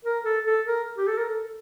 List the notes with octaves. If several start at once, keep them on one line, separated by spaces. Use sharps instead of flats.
A#4
A4
A4
A#4
G4
A4
A#4
A4